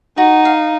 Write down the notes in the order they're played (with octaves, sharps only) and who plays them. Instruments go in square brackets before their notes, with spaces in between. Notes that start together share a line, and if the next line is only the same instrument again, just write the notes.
[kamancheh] D#4 [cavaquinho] F#4
[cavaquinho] F5